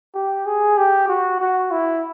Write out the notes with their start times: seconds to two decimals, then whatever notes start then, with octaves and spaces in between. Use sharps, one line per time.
0.14 G4
0.46 G#4
0.78 G4
1.08 F#4
1.40 F#4
1.71 E4